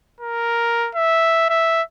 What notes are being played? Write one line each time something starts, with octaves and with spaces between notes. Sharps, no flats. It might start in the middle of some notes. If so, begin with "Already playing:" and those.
A#4
E5
E5